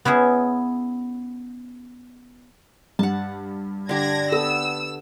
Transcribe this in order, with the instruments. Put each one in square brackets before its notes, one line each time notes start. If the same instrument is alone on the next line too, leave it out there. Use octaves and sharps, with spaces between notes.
[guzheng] B3 C#4 E4 G#4
[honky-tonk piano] G2 [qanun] F#5 A5
[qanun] D3 G4 G5 [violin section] D4 G#6 A#6
[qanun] B3 [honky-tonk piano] A4 [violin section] E6